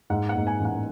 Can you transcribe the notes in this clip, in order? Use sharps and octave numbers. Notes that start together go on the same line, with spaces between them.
G#2 F#5
F#5
G#2
G#5
A1
F#5